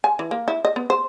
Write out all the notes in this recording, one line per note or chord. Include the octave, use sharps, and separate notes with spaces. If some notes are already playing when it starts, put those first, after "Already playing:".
G#5
E3
A#3
E4
D#5
B3
C5